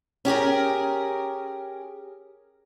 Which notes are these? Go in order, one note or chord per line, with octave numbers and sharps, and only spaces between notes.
C#4 G4 G#4 A#4